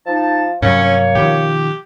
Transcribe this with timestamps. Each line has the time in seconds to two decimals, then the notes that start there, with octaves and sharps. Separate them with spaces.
0.06 F3 D#4 A5
0.62 G2 C3 F#3 A#3 C#4 C#5
1.15 B2 D#3 F3 G4